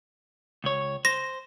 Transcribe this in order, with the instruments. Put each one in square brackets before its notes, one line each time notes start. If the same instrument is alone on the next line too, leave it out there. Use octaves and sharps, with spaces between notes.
[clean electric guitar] C#2 C#5
[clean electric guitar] C5 [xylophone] A#6